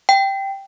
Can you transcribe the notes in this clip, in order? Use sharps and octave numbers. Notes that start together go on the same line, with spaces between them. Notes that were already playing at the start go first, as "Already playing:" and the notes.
G5